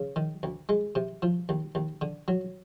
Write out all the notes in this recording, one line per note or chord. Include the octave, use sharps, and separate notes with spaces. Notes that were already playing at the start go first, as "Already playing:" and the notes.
Already playing: C#3
D#3
D2
G#3
C3
F3
D#2
D#2
D3
F#3